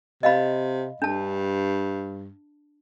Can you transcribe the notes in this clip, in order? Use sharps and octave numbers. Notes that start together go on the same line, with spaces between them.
C3 D#5 F5 B5
G2 D4 A5